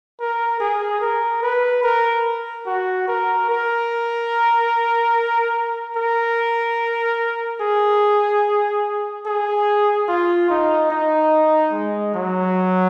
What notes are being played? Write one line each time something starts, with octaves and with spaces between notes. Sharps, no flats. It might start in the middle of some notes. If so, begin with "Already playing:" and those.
A#4
G#4
A#4
B4
A#4
F#4
A#4
A#4
A#4
G#4
G#4
F4
D#4
D#4
G#3
F#3